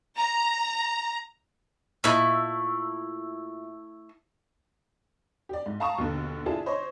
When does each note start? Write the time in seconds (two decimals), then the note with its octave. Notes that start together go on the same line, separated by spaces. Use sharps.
0.18 A#5
2.04 A#2 A3 E4 D#5
5.49 G4 D5
5.66 G#2
5.80 F5 A5 A#5 C#6 D#6 E7
5.98 D#2 B2 D3
6.46 D4 E4 F4 G#4 A5
6.66 C5 C#5 D#5 C6